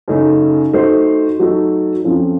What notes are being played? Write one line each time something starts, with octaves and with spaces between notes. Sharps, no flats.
F#2 C#3 A3 D#4
A3 D#4 F#4 C5
F#3 A3 D#4 F#4 A4
F#2 F3 A3 C4 F4